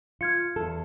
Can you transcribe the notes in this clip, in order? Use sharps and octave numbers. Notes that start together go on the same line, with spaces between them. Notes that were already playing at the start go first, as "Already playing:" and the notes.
F4 F6 G#6 C#7
E2 A4